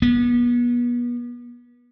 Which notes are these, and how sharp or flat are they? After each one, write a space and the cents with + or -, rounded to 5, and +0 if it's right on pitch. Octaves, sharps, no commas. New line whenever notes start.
B3 -35